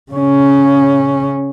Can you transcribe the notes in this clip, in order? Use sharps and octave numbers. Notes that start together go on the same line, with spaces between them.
C#3 C#4